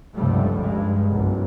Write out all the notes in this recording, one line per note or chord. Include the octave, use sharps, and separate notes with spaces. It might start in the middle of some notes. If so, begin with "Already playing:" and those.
F1 C#2 G2 G3 A3
G2 G#3
F#1 B1